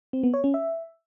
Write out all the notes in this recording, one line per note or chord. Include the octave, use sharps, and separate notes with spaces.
C4
B3
C#5
C#4
E5